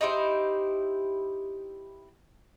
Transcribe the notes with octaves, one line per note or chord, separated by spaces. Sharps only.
D#4 E4 G4 C5